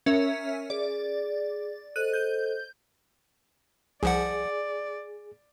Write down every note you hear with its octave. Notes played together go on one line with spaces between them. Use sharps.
C#4 A#4 E5
G#4 D5
A4 C5 D#5 F#6 D#7
G6
C2 F3 G#4 D5 F#5